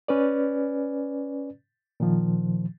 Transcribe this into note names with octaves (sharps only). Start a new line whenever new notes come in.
C#4 B4 D5
A#2 D#3 F3